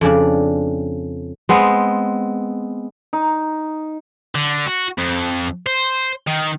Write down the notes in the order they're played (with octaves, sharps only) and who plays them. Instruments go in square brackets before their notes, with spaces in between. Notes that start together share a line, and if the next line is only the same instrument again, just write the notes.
[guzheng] F2 C#3 D4
[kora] G#3 B3 C4
[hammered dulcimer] D#4
[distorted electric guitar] D3
F#4
F2
C5
D#3